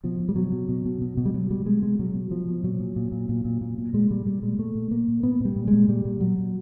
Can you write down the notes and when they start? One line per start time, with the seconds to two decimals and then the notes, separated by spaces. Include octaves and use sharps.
0.04 B2 F3
0.20 B2
0.29 G3
0.36 B2 F#3
0.52 B2
0.69 B2
0.86 B2
1.02 B2
1.17 B2
1.26 G3
1.34 B2 F#3
1.50 B2 G3
1.65 B2 G#3
1.82 B2 G#3
1.99 B2 F#3
2.15 B2
2.31 B2 F3
2.48 B2
2.63 A#2 F#3
2.80 A#2
2.96 A#2
3.12 A#2
3.29 A#2
3.45 A#2
3.61 A#2
3.78 A#2
3.93 A#2 G#3
4.10 A#2 G3
4.26 A#2 G3
4.42 A#2 G#3
4.58 A#2 A3
4.75 A#2
4.91 A#2 A#3
5.08 A#2
5.23 A#2 B3
5.40 A#2 G3
5.56 A#2
5.68 G#3
5.73 A#2
5.88 A#2 G3
6.05 A#2
6.21 A#2 F#3
6.38 A#2